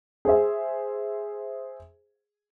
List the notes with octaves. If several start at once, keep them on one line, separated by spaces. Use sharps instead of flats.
G#4 C5 E5